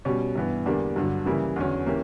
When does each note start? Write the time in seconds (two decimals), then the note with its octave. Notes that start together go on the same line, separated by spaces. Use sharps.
0.05 B2 G3 C#4
0.36 G2 E3 B3
0.65 E2 D3 G3 A#3 D4
0.96 G2 D3 F#3
1.26 C#3 E3 G3 A#3 E4
1.56 E2 D3 F#3 C#4
1.86 E3 A#3 C#4 G4